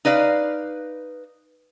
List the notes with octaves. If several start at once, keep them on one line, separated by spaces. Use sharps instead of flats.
D#4 B4 D5 F5